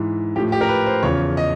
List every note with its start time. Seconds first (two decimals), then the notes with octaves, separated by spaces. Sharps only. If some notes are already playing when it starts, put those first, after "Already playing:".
Already playing: G#2 E3
0.35 F3 G4
0.38 A2
0.52 G4
0.61 A#4
0.69 B4
0.87 C5
1.03 E2 C#3 F3 C#5
1.37 D#5